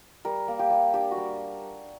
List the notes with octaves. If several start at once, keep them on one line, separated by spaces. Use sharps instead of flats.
G3 A#4
A#3
G4
G3
D4 G4
F#4
G3